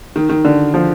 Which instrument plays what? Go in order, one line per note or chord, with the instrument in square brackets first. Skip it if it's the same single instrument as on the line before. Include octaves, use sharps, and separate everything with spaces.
[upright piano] D#3
D#3
D3
F3